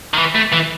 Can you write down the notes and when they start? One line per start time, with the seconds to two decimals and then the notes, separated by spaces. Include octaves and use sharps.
0.14 D#3
0.18 E3
0.35 A3
0.52 E3